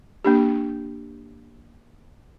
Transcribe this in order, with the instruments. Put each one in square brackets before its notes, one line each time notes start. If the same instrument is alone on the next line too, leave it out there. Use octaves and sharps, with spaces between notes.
[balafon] A#3 D4 G4